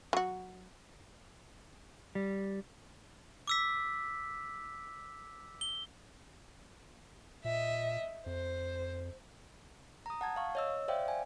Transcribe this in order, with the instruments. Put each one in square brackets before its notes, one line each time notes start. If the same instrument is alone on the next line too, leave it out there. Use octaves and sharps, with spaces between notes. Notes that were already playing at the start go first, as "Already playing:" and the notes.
[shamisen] F#3 F#4
[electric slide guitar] G3
[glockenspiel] D6 E6 B6
G7
[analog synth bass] A#2 [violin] D#5 E5
[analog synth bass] F2 [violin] C5
[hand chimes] A#5 D#6
F#5 A5 G#6
F5 C#6
C#5 D#5 E6
C5 D5 E5 F5 G5
G#5